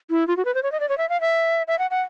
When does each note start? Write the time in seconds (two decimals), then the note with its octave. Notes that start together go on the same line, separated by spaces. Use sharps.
0.11 E4
0.28 F4
0.37 F#4
0.45 B4
0.55 C5
0.63 C#5
0.72 D#5
0.80 D5
0.89 C#5
0.98 E5
1.09 F5
1.21 E5
1.68 E5
1.79 F#5
1.91 F#5